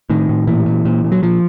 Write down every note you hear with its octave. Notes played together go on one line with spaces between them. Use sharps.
A2 D#3
A2
A#2 E3
A#2
A#2
A#2
F#3
A#2 F3